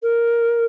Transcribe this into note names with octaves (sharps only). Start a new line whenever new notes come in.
A#4